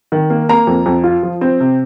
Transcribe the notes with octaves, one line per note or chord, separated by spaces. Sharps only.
D#3
A#3
A#3 A#5
F2
F2
F4
F3
C4
C3